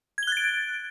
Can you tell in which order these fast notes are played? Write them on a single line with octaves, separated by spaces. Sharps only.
G#6 G7 F#6 A6 D7